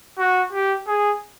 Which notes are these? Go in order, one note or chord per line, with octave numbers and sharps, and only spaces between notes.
F#4
G4
G#4